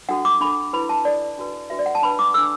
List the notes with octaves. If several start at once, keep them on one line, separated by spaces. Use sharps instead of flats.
D4 F#4 A4 F#5
D6
D4 A4 B5
E4 B4 B5
A5
D4 A4 D5
D4 F#4 B4
D4 F#4 B4 E5
D5
F#5
A5
D4 B4 B5
D6
D4 A4 E6